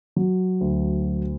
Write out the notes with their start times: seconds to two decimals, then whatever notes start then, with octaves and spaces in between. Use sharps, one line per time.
0.16 F#3
0.61 D2